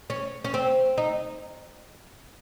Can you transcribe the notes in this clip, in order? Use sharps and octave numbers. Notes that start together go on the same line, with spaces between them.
C#4
C#4
C4
D#4